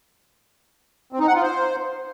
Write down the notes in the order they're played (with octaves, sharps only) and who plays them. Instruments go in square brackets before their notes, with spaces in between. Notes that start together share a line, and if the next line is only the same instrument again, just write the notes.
[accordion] C4
D#4
F#5
F4
C5